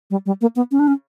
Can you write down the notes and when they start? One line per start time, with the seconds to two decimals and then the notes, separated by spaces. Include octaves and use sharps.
0.10 G3
0.26 G3
0.41 A#3
0.56 B3
0.71 C#4
0.79 D4
0.88 C#4